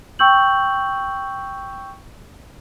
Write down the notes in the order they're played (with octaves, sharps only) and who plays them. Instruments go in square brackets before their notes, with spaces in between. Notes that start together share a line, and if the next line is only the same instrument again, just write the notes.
[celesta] G5 C#6 E6 G6 F#7